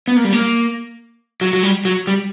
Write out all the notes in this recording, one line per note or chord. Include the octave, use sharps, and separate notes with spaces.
B3
A#3
G3
A#3
F#3
F#3
G3
F#3
G3